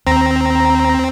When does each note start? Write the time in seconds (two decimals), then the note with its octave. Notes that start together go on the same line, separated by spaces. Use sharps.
0.07 D#2 C4 A#5